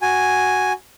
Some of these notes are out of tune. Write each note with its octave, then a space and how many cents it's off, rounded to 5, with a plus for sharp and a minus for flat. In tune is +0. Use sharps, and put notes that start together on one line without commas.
F#4 +0 G#5 +0